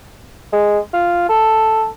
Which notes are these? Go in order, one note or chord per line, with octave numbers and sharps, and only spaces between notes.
G#3
F4
A4